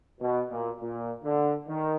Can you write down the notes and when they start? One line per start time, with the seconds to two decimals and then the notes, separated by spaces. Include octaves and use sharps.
0.21 B2
0.50 A#2
0.80 A#2
1.23 D3
1.68 D#3